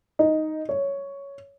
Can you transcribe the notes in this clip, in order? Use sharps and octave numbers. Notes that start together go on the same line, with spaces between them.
D#4
C#5